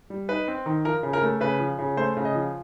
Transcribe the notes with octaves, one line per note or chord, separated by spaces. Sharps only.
G3
D#4 B4
C4
D#3
F3 A#4
C#3
A#4
A3
C#3 B4
F3
C#3
A3 C5
C#3
D#5
F3